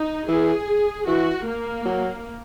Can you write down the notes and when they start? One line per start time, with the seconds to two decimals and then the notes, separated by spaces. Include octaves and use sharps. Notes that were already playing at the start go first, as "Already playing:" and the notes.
Already playing: D#4
0.28 E3 G#4
1.07 E3 F#4
1.46 A#3
1.85 F#3